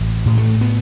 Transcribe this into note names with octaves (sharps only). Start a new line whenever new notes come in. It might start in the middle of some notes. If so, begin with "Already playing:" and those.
Already playing: A1
A2
A3
B3